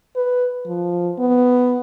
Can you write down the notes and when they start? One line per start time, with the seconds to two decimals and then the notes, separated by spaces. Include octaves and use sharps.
0.16 B4
0.66 F3
1.19 B3